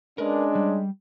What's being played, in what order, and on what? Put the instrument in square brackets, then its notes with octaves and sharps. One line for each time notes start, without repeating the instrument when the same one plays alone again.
[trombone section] G#3 C#4 D4 [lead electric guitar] A#4 B4
[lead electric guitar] G3